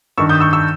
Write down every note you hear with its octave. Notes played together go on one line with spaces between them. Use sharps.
G2 D#3 C#6 E6
D#6 G6
C#6 E6
C#6 E6